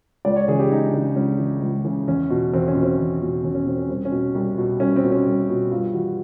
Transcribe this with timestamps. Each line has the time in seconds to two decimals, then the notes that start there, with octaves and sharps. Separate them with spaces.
0.25 C#2 D5
0.36 C#5
0.48 C#3 E3 G#4
0.59 G4
0.71 C#2 D#4
0.87 D4
0.93 C#3 E3
1.16 C#2 C#4
1.39 C#3 E3
1.62 C#2
1.84 C#3 E3
2.07 E2 C#4
2.30 B2
2.53 E2 C4
2.68 C#4
2.75 B2
2.83 C4
2.99 E2
3.21 B2
3.44 E2 C#4
3.55 C#4
3.66 B2 C4
3.78 C#4
3.89 C2 C4
4.05 C#4
4.12 B2
4.35 C2
4.58 B2
4.80 C2 C#4
4.96 C4
5.04 B2
5.11 C#4
5.26 C2
5.49 B2
5.71 G2 F4
5.94 E3 F#4